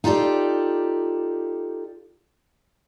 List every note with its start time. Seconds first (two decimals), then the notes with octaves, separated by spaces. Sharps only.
0.04 D#4 F4 G4 A4 D5